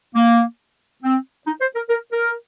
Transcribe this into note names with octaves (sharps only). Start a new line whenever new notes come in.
A#3
C4
D#4
C5
A#4
A#4
A#4